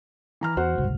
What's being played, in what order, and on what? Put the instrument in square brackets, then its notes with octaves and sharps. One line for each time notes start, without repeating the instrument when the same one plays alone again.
[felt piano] E3 A#5 F6
[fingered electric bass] E2 [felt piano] F#4 C5 F#5
[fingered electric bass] F#1 C2 G#2